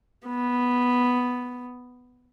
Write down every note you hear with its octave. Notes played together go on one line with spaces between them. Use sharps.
B3